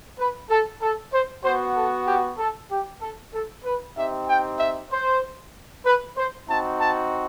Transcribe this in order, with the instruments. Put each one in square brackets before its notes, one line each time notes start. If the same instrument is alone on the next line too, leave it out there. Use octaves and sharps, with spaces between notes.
[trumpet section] B4
A4
A4
C5
B3 F#4 C5
A4
G4
A4
G4
A4
A4
B4
C4 D#4 G4 E5
G5
E5
C5
B4
C5
C4 D#4 F#4 A5
A5